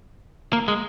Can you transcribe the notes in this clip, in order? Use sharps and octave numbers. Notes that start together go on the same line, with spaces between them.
A#3
G#3